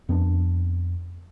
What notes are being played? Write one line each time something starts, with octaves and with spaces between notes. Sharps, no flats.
F2 B3 C#4 D4